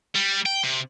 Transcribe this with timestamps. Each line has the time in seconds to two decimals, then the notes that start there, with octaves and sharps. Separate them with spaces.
0.15 G3
0.46 G5
0.64 C3